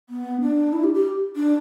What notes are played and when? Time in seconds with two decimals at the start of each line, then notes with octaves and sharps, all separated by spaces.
0.10 B3
0.41 D4
0.73 E4
0.84 G4
0.94 G4
1.36 D4